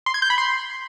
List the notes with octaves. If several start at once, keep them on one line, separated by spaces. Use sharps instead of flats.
C6
G#6
G6
B5
C6